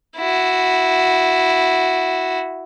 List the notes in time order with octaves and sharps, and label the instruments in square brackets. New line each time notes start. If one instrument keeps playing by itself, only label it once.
[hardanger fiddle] E4 F#4